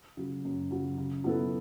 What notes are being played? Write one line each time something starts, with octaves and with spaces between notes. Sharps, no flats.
C#3 F#3
F#2
C#3 F#3
C#3
F#3 B3 E4 A4